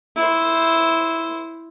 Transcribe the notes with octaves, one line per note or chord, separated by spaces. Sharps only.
E4 C5